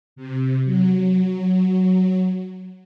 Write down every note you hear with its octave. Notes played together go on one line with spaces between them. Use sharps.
C3
F#3